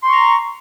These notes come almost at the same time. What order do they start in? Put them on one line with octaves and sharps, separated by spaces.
C6 C#6 A#5